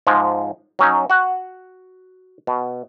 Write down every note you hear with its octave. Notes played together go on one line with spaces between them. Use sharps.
G#2 F3 G#3
F#3 C#4 D#4
F#4 F#5
B2